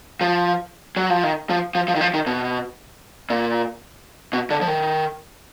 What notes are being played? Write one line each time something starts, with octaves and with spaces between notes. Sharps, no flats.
F3
F#3
F3
D#3
F3
F3
F3
D#3
F3
D#3
B2
A#2
B2
D3
F3
D#3